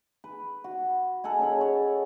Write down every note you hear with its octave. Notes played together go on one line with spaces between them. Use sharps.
B4
F#4
A4 D#5 F#5 G#5
C#4 G#4 A4 B5
C#5 F#5